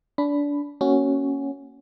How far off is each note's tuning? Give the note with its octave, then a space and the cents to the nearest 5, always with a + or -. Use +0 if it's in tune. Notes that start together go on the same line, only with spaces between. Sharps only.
D4 -25 B5 +5
A#3 +0 C#4 +0 F#4 +15